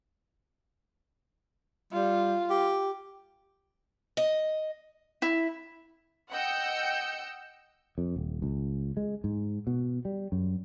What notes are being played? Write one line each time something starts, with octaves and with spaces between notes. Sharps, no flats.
G3 F4
G4
D#5
E4
D#5 F#5 G5 E6 G6 C#7
F2
D#1
C#2
G#3
G#2
B2
G3
F#2